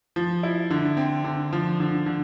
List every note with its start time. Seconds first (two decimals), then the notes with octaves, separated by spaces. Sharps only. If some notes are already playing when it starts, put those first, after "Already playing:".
0.16 F3
0.43 E4
0.70 D3
0.97 C4
1.24 D3
1.53 F3
1.80 D3
2.06 D3